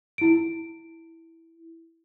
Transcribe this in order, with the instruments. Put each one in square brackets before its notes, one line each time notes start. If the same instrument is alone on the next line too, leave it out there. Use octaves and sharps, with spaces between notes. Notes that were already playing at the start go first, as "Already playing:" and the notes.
[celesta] E4 D7